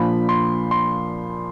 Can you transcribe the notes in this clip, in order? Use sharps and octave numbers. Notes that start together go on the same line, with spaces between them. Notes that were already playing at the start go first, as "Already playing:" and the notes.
Already playing: A#2 F3 A#3 D4 B5
C6
C6